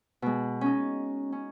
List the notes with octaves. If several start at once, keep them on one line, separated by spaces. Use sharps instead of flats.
B2 G#3
C#4 D#4
C#4